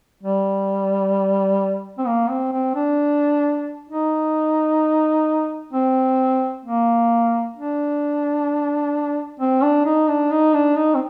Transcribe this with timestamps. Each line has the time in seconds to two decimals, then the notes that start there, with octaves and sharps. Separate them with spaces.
0.23 G3
1.98 C4
2.07 A#3
2.29 C4
2.52 C4
2.75 D4
3.89 D#4
5.73 C4
6.65 A#3
7.56 D4
9.40 C4
9.62 D4
9.85 D#4
10.08 D4
10.31 D#4
10.54 D4
10.77 D#4
10.94 C4